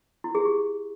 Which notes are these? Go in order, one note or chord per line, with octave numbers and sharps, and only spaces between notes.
E4
G#4
G4